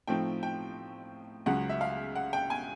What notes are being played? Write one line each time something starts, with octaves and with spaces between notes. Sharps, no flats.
A2 F3 A3 C4 D#4 G5
G5
C#2 C#3 F#3 F#5
E5
F5
F#5
G5
G#5